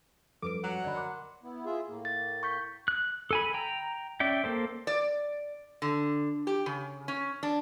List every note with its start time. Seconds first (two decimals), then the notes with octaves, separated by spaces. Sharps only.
0.42 F#2 F3 G3 A4 B4 D6 D7
0.64 F#3 F#5
0.83 F#2 D3 D5 D#5 B5
0.95 A#4 C6 D6 F#6
1.43 B3 E4
1.65 F4 G#4 E5
1.88 A2 A#3
2.05 A6
2.43 C#6 G6 B6
2.88 F#6
3.31 A4 G#5 B5
3.54 G5 A#5
4.20 C#4 D5 E5 G5
4.44 A#3 A4 C5
4.87 D5
5.82 D3
6.47 G4
6.66 C#3
7.08 C#4
7.43 D4